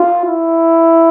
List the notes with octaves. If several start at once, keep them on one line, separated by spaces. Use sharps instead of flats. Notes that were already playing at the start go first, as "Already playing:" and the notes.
Already playing: F4
E4